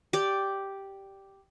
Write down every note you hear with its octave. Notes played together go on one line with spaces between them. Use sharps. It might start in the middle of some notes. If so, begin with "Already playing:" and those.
G4 D5